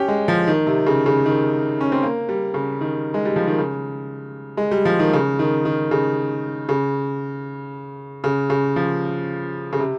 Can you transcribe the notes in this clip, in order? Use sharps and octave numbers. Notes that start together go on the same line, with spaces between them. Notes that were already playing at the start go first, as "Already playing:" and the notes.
Already playing: C#4 G4
G#3
F3
D#3
C3
C#3
C#3
D#3
C#4
C4
A#3
G3
C#3
D#3
G#3
G3
F3
D#3
C#3
G#3
G3
F3
D#3
C#3
D#3
D#3
C#3
C#3
C#3
C#3
F3
C#3
C3